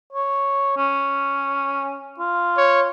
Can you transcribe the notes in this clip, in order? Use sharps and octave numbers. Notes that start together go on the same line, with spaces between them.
C#5
C#4
F4
C#5